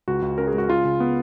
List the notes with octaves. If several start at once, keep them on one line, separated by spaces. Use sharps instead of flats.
C#2 F#4
C#2
C#4 A#4
G#4
G#3 F#4
C#3 F4
C#3
B3